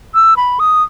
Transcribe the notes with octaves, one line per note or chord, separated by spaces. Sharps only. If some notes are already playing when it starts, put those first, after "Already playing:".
E6
B5
D#6